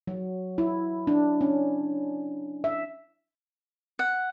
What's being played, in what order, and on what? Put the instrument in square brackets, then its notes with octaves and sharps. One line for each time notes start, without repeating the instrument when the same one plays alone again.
[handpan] F#3
E4
D4
C#4
E5
[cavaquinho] F#5